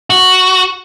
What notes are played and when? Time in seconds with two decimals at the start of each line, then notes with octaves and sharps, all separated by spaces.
0.10 F#4